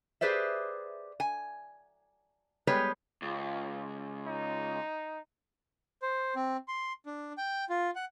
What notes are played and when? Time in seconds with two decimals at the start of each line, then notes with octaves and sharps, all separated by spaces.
0.21 G4 G#4 B4 C5 D5 E5
1.20 G#5
2.67 G3 G#3 B3 G4 B4 C#5
3.22 C#2
4.27 D#4
6.02 C5
6.35 C4
6.68 C6
7.06 D4
7.38 G5
7.69 F4
7.95 F#5